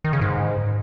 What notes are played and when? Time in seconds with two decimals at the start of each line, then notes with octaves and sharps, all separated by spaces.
0.04 D#3
0.13 C#3
0.21 G#2